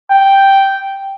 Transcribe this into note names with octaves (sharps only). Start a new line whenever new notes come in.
G5